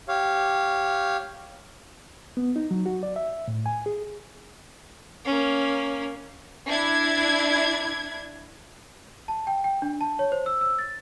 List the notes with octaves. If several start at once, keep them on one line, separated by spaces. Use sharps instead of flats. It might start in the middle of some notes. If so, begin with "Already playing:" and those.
G4 C#5 F5
B3
D#4
F#3
F#4
D5
E5
A2
G#5
G#4
A#3 C#4
D4 E4 G#6
A5
G5
G5
D4
A5
C#5
C5
E6
E6
A6